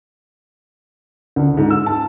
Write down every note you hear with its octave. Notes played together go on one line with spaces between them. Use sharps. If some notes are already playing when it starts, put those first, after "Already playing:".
D2
G#2
E6
A5